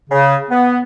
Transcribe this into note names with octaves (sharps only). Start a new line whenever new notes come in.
C#3
B3